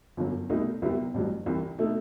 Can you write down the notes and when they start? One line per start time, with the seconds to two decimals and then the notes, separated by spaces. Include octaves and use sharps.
0.17 G1 F#2 F#3
0.50 C2 B2 A3 D#4
0.82 C2 C3 F#3 B3 E4
1.14 A1 G2 F#3
1.46 C2 C3 E3
1.78 B2 A3 D#4 A4